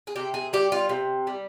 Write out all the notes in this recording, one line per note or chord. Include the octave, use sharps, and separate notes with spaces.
G#4
C3 G4
G#4
G3 G4
F4
C3
G3